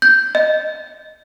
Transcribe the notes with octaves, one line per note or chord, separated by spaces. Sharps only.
G6
D#5